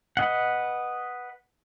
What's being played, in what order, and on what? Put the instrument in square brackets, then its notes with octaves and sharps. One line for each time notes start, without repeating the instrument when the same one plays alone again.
[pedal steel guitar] B4 D#5 F#5